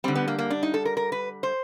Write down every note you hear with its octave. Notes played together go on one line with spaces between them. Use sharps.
D3 G3 C4
B3
A#3
A#3
D4
D#4
A4
A#4
A#4
B4
C5